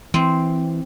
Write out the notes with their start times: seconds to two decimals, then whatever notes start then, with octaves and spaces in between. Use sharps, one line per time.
0.14 E3 C4